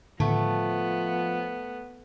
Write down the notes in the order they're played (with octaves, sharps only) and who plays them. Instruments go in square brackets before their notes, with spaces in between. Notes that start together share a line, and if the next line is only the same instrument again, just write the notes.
[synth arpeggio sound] A2 D3 D#3 [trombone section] F3 [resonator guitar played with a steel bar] A3 [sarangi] B3